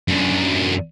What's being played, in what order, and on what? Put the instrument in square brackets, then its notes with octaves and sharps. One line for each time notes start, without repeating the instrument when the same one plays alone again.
[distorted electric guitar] F#2 D3